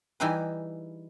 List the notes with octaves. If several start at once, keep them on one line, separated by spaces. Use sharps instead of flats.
E3 G3 D#4 E4 G#4 B4